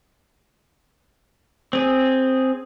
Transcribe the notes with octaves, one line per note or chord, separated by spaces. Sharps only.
C4 G#4